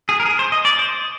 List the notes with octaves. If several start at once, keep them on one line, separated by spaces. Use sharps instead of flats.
G#4
A#4
G#4
C5
D#5
D5
C5